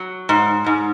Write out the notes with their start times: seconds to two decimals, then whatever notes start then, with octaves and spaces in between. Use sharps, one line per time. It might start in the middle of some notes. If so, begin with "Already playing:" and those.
Already playing: F#3
0.29 G#2
0.66 G#2